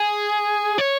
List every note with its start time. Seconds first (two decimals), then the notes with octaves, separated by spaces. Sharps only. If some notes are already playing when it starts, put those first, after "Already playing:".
Already playing: G#4
0.78 C#5